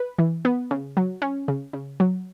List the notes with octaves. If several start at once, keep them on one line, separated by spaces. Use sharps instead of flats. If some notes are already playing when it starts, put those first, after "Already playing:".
Already playing: B4
E3
B3
C#3
F#3
C#4
C#3
C#3
F#3